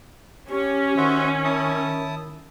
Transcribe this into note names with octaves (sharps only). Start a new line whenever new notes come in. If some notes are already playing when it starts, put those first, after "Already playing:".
C#4 G4
D#3 F#4 C5 E5
E4 A5 D#6